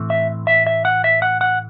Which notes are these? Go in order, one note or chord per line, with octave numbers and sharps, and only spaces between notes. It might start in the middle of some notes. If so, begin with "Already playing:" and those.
Already playing: A2 E3 A3 C4
E5
E5
E5
F#5
E5
F#5
F#5